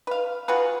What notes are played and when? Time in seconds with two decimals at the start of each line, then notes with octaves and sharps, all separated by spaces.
0.07 B4 F5
0.48 F4 F#4 G#4 B4